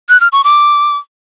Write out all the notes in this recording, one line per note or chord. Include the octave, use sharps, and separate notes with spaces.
F#6
F6
C#6
D6